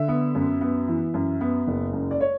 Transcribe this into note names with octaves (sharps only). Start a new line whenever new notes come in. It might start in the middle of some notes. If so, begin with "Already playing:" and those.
Already playing: D3 E5
B3
F#2
B3
E3
F#2
B3
F#1
F#2
D5
C#5